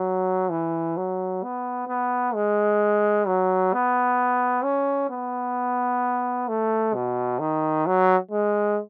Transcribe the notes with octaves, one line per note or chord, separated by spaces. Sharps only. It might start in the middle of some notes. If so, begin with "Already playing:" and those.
Already playing: F#3
E3
F#3
B3
B3
G#3
F#3
B3
C#4
B3
A3
B2
D#3
F#3
G#3